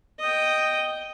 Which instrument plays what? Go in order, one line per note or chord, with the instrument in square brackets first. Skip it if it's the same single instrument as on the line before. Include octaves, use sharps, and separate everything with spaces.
[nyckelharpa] D#5 G5